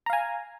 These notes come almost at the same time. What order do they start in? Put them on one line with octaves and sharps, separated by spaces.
A#5 F5 G#5